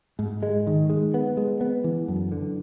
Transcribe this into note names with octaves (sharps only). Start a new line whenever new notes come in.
G#2
G#3
D#3
G#3
B3
G#3
B3
E3
F#2
D3